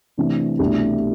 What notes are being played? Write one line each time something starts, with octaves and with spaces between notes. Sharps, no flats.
C3 E3 A3 D4
C2 B2 A3 D4